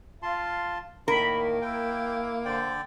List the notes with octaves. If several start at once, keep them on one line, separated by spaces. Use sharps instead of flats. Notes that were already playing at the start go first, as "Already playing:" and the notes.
F4 F5 A5 C6
A2 D#3 A#3 A#4 B5
E4 G5
D3 C5 D5 G5